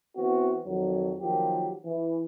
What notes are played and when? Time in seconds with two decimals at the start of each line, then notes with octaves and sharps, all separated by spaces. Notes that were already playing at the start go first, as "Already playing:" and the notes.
0.17 E3 B3 C4 F#4
0.66 F2 D#3 F#3
1.19 D#3 F3 F#3 A#3 G4
1.85 E3